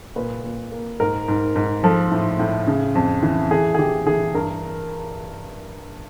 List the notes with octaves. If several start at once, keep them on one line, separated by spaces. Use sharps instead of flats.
A#2 B4
A#2
A#3
G#2 A#4
G#2
G#2
F3 A4
A2
A2
C#3
F2
E3
E3 G#4
G#4
E3 G4
E3 G#4
G2 A#4